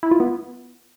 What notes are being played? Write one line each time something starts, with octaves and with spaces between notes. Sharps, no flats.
E4
F4
B3